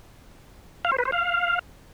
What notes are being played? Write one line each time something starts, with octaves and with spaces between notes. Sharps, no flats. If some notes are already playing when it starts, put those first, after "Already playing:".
F5
C5
B4
C5
F5